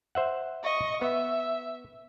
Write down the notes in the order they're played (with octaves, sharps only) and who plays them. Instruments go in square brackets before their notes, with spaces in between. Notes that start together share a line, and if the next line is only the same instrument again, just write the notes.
[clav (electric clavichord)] C5 E5 F#5
[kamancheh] D#5 C#6
[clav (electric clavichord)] B3 [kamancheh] E5